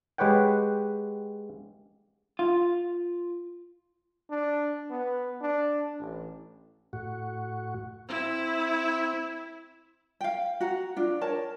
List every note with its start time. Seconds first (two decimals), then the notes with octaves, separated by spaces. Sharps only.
0.18 G#3 G4 B4 C#5 F#5 G5
2.39 F4
4.30 D4
4.90 B3
5.41 D4
5.99 A1
6.93 A2 F#4
8.09 C4 E4
10.21 F5 G5
10.60 F#4 F#5 A#5
10.96 D4 F4
11.21 A#4 C#5 A5